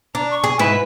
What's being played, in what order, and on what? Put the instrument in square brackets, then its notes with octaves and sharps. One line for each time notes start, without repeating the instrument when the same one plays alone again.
[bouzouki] D4 [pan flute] A#5
[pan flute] C#6
[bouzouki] G#4
[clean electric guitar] G#2 E4 E5 [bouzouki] B4 [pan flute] G#5